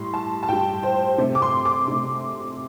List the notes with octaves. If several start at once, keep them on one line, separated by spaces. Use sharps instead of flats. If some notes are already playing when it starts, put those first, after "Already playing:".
Already playing: A2 G3 C6
A5
A5
A2 G3 G5
C5
C3 A3
D6
C6
D6
C3 A3